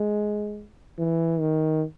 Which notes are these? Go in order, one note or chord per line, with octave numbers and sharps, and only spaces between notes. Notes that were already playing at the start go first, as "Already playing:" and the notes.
Already playing: G#3
E3
D#3